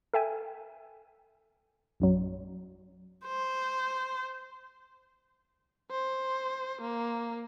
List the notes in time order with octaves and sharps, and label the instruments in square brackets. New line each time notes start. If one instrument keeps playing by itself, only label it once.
[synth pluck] A4 E5 G5 G#5
A#1 F#2 F#3
[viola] C5
[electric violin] C5
A#3